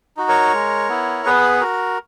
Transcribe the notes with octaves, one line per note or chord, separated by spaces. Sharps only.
D#4 F#4
A#4 C#5
G#3
B3 E4
B3 G#4 B4
F#4 A#4